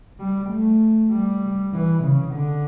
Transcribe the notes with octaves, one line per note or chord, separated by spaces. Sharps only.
G3
A3
G3
E3
C#3
D3